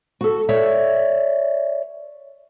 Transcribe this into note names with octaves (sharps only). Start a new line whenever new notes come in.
F#4 A4
C#5 D5 E5